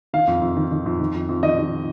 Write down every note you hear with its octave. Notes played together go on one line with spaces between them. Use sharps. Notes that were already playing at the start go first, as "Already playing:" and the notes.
D#3 F5
F2
F2
D#3
D#3
F2
D#3
F2
F2
D#3 D#5
D#3